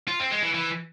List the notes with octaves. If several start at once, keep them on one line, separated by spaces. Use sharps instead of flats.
F4
C4
G#3
E3
E3